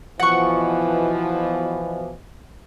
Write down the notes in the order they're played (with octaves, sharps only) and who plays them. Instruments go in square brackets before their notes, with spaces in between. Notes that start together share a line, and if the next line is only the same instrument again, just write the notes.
[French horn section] B2 E3 F3 [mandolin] F#5 C#6